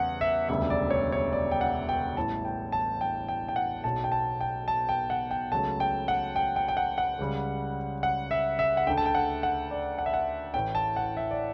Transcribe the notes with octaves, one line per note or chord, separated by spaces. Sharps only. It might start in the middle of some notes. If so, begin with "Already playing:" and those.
Already playing: E2 C#3 G3 F#5
E5
E1 D2 C#3 G3 E5
D5
C#5
C#5
D5
G5
F#5
G5
A1 A2 E3 G3 A5
G5
A5
G5
G5
G5
F#5
B1 B2 F#3 A5
G5
A5
G5
A5
G5
F#5
G5
C#2 C#3 F#3 A3 A5
G5
F#5
G5
G5
G5
F#5
F#5
C#2 C#3 G3
F#5
E5
E5
F#5
D2 D3 A3 G5
A5
G5
F#5
F#5
D5
F#5
E5
F#5
A1 A2 E3 G5
A5
F#5
E5
D5